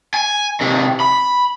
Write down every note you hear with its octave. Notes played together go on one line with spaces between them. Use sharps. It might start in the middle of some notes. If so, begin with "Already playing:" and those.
G#5
C3 D#3
B5